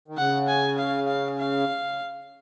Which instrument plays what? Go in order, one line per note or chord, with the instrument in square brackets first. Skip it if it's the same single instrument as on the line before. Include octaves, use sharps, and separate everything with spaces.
[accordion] D#3
[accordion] C#3 [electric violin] F#5
[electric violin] G#5
F5
F5
F5